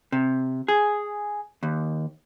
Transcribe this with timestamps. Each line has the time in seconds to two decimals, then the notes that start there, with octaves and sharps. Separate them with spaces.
0.12 C3
0.68 G#4
1.63 D#2